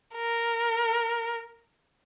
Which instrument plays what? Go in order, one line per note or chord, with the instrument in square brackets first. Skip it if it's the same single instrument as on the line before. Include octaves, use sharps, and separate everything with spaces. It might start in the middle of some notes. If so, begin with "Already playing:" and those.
[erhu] A#4